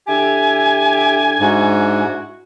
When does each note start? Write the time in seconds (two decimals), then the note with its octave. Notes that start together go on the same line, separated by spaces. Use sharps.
0.07 D3 E4 G4 G#5
1.40 G#2 D4 E4 F#4